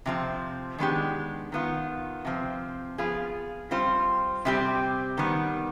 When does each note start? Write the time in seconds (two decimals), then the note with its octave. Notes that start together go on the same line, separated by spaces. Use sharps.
0.06 C3 F3 C4
0.78 D#3 G#3 B3 D4 G4
1.52 D#3 B3 F4
2.25 C3 F3 C4
2.98 F3 B3 F4 G#4
3.71 G3 C4 F4 C5
4.45 C3 G3 C4 G4
5.18 D#3 G3 B3